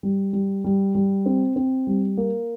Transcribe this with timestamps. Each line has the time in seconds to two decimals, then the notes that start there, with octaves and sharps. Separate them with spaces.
0.03 G3
0.33 G3
0.64 G3
0.95 G3
1.26 C4
1.56 C4
1.87 G3
2.17 A#3